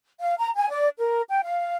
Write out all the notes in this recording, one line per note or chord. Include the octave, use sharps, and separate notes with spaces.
F5
A#5
G#5
D5
A#4
G5
F5